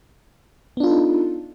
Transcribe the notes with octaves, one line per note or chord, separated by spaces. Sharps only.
B3 D4 D#4 F4 A4